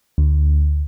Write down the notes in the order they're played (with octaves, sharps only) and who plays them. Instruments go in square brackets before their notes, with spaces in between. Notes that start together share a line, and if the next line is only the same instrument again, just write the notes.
[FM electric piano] D2